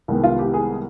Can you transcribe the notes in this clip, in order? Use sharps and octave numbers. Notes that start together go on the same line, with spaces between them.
C2 C3 D#3 G#3 B3
F4
G4
G#4